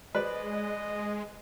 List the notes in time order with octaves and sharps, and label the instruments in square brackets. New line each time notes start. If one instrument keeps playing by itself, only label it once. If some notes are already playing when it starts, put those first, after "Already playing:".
[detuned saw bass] G#3 [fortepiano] B4 C5 D5 [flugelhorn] D#5